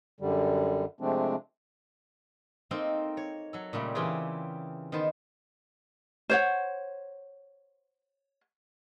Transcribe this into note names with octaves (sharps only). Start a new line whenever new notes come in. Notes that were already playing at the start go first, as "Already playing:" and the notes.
F#2 D3 G3
C3 F3 G#3 A3 C4 D4
A#3 C4 D#4 A4 A#4 C5
C#5
F#3 A4
A#2 C#3 G3 A3
C#3 E3 C4 F4 G4 G#4
D#3 B3 C5 A5
C5 C#5 F#5